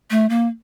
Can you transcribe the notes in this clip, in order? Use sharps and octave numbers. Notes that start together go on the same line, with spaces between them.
A3
A#3